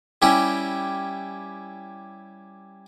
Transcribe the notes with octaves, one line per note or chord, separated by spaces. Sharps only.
G3 C#4 E4 G4